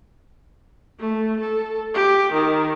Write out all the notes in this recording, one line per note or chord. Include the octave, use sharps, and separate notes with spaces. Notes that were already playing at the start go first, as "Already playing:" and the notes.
A3
A4
G4
D#3